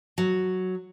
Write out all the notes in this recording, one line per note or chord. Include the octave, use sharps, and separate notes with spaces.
F#3